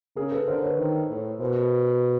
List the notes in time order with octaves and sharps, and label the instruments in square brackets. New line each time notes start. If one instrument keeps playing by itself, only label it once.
[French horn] C#3 [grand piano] G#4 A#4
[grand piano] A4 B4
[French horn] D3 [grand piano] A#4 C5
[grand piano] B4 C#5
[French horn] D#3 [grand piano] A#4 C5
[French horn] A2
[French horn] B2 [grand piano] A#4 C5